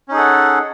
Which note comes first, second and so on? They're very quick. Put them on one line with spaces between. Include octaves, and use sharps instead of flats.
C#4 D#4 G#4 A4 F#5